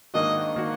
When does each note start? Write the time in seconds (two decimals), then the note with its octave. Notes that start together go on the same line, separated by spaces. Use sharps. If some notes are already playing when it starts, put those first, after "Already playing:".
0.14 G#2 D#3 A#3 D4 F#4 D#5
0.56 D#3 A#3 D4 F#4